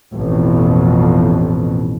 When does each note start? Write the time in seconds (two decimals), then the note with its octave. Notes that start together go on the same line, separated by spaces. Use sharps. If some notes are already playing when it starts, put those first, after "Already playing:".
0.14 A1 F2 B2